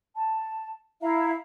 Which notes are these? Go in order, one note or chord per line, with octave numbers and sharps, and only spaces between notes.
A5
E4 E5 F5 A#5